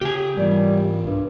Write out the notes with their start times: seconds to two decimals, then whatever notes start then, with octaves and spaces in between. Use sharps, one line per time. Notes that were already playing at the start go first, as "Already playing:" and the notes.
0.01 C#3 G4 G#5
0.37 G#2 E3 G3 B3 F4 A#4
1.04 B1 G2